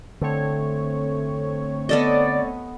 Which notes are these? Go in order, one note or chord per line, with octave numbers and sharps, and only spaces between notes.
D3 A3 C4 C#5
B3 A4 D5 D#5